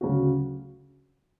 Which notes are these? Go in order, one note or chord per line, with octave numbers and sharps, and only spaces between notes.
D2 C#3 F#3 C#4 F#4